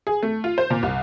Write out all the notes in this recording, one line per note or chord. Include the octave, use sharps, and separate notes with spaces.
G#4
A3
F4
C5
A#2
C2